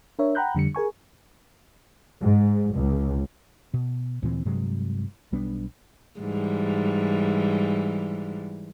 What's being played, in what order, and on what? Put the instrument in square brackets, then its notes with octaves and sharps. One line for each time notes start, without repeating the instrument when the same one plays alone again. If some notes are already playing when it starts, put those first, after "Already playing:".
[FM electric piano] D4 A#4 C#5 E5
F#5 G5 A#5 B5 F#6 G6
F2 D3 G3 C#7
G#4 A#4 G#5 C#6
[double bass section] G#2
C#2
[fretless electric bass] B2
D2 A#2 E3 C4
G2 C3 F#3 G#3
B1 G3 B3 D4
[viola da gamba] G#2 E3 G3